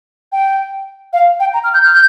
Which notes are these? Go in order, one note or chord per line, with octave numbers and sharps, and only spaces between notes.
G5
F5
G5
A#5
F6
G6
F6
G6